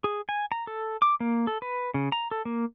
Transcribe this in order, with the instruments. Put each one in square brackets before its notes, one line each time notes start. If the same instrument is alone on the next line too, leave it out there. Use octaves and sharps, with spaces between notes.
[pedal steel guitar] G#4
G#5
A#5
A4
D6
A#3
A4
B4
C#3
A#5
A4
A#3